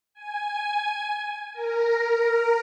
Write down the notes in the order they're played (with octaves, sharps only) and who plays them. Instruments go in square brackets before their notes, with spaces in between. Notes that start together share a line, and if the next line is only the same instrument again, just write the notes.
[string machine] G#5
A#4